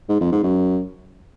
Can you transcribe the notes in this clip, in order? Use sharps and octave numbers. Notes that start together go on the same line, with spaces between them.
G#2
F2
G#2
F#2